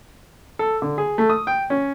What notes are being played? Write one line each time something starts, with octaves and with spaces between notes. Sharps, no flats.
A4
D3
G#4
A3
D#6
G5
C#4